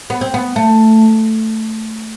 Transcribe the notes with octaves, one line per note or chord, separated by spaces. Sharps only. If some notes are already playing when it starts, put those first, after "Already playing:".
B3
C4
B3
A3